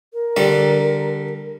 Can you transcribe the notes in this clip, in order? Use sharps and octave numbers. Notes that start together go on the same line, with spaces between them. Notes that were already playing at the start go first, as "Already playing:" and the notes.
A#4
D3 G3 D5